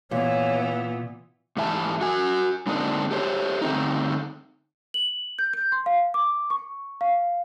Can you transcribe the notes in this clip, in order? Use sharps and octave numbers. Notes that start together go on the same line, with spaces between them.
A#2 E3 B3 C#5
G#2 E3 E5 G#5 A5
F#4 G#5
D3 G#3 A#3 C4 D4 D#4
G4 A4 C5 C#5
D3 A3 C4 D#4
F#7
G6
G6
C6
F5
D6
C#6
F5